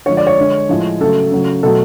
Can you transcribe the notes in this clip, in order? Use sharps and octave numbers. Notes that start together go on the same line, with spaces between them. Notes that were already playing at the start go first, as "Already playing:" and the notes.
D3 F3 G#3 C#5
D5
C#5
D3 G#3
A2 F3 G#3
C#3 F#3 A3 A4
C#3 F#3 A3
B2 F#3 A3 A4